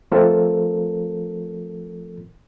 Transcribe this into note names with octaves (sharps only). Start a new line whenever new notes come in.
F3 A3 C4 F4 A4 A#4